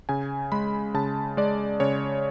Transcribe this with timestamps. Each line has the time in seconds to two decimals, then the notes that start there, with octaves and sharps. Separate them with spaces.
0.09 C#3 G#5
0.52 G#3 B5
0.94 C#3 A5
1.37 G#3 D5
1.80 C#3 C#5